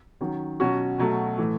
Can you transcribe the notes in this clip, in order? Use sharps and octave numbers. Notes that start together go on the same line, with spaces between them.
D#3 F#3 C#4
B2 F#3 C#4 F#4
B2 F#3 A3
A2 E3 A3